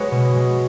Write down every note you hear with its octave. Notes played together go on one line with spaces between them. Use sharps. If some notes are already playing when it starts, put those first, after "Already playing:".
Already playing: G#3 F#4 G#4 B4 C#5
B2
G#3